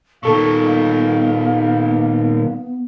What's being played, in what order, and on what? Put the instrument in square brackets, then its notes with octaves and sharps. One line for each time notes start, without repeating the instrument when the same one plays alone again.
[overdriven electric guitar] A#2 D#3 [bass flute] B3 [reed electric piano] A4 C#6 [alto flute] F5